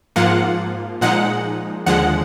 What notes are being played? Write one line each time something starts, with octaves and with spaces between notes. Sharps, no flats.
G#2 F3 A#3 F4 F#5
A#2 F3 G#3 D#4 F#5
D#2 D3 F3 G#3 F#5